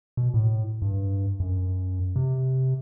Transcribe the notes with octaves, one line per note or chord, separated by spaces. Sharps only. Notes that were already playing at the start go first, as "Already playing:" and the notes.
B2
A2
G2
F#2
C3